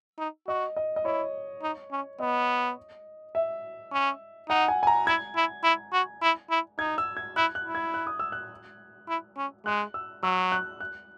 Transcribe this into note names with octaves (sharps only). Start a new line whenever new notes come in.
D#4
F#4 D#5
D#5
D#5
E4 C#5
D#4
C#4
B3 D#5
E5
C#4
D#4 F#5
G#5
G#5
A#5
E4 G#6
E4
E4
F#4
E4
E4
D#4 G#6
E6
G#6
E4 F#6
F#6
E4
G#6
F#6
D#6
E6
F#6
E4
C#4
G#3 F#6
E6
F#3 E6
F#6
F#6